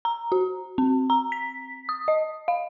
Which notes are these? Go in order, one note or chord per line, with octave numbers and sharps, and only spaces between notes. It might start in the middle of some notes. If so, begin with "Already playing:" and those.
A#5
F#4
C4
A#5
B6
D#6
D#5
F5